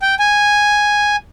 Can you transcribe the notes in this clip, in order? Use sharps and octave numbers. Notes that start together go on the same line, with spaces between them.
G5
G#5